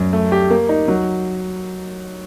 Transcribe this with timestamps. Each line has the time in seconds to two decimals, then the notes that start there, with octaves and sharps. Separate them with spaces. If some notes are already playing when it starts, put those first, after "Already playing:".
Already playing: F#2
0.13 A3
0.32 G4
0.50 A#3
0.69 D#4
0.88 F#3